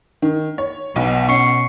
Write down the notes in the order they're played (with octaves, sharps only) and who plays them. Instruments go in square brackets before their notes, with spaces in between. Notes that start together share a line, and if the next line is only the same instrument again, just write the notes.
[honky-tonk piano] D#3
C#5
[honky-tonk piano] B1 [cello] B2
[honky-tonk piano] C#4 [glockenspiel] C#6 C7 C#7